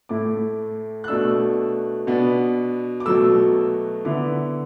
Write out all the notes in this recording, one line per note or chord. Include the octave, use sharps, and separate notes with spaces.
A2 A3 E4 D6
F#6
B2 A3 D4 E6
B2 B3 D4
D6
B2 F#3 A3 E6
D3 B3 E4 D6